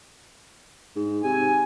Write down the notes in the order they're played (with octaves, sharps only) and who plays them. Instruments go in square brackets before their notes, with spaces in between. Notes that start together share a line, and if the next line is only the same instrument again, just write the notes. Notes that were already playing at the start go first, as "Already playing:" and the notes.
[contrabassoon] G#2
[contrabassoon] C3 [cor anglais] G#5